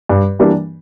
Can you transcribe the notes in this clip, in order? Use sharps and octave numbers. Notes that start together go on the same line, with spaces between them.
G2
E3 G3 A#3 D4